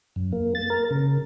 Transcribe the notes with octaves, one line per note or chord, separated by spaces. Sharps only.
F#2
A#3
A6
A#4
C#3